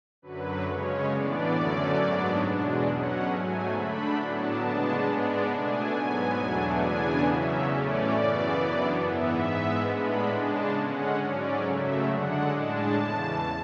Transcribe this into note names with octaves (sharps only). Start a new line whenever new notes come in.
F#2 D3 F#3 B4
C#3 G#3 C#4 C#5
A2 E3 B3 D4 D5
F#2 D3 F#3 A3 C#4
G#2 F#3 B3 D4
E2 B2 G#3 D4
B2 F#3 C#4 F#5
G#2 F#3 A3 G#5
D3 A3 D4 B5
A2 F#3 B3 D4 A5
C#3 G#3 B3 D4 A5
G#2 G#3 B3 D4 D5
B2 A3 D4 G#5
G#2 F#3 B3
E2 B2 F#3 A3 D4
E2 C#3 E3 B3 D4 G#5
E2 C#3 F#3 C#4 E5
A2 E3 A3 C#4 D5
F#2 C#3 E3 B3
F#2 E3 B3 D4
G#2 E3 B3 E5
G#2 G#3 B3
A2 G#3 B3 D4 B5
C#3 G#3 D4 A5
D3 G#3 C#4 F#5
G#2 F#3 C#4 D5
F#2 C#3 F#3 A3 E5
D3 G#3 D4 F#5
A2 G#3 D4 A5
E2 C#3 E3